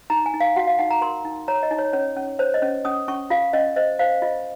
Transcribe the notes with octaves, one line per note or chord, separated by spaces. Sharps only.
D#4 A#5
G#5
D#4
F5
F#4 F#5
F5
D#4 F#5
A#5
A#4 C6
D#4
C#5 A#5
D#5
D#4
C#5
C#4 C#5
C#4
C5 C#5
D#5
C#4
C#4 D#6
C#4 C#6
F4 F5
C#4 D#5
C5 D#5
C5 F5
F4 D#5